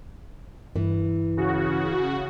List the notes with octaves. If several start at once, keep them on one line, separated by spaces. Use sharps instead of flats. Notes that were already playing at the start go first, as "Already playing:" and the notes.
G2 E3
C#3 F#4